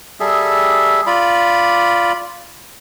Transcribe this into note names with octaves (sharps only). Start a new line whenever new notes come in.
G3 G#4 A4 E5
F4 D5 B5